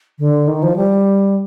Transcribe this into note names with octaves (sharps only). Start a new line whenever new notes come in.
D3
D#3
F3
G3